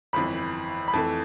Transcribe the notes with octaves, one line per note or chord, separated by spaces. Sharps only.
G1 F2 E3 B5
B5
F2 E3 A3 A5